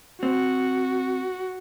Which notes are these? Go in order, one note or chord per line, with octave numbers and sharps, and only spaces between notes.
C4 F#4